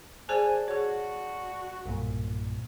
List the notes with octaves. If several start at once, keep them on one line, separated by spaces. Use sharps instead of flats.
G#4 C5 D5 G#5 A5 F#6
F#4 G#4 C#5
B1 G2 A#2